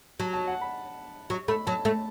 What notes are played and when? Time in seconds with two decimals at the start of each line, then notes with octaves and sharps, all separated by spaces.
0.20 F#3 A5
0.33 A5
0.47 F#5
0.61 B5
1.30 F#3 C#6
1.48 A3 B5
1.67 F#3 A5
1.85 A3 A5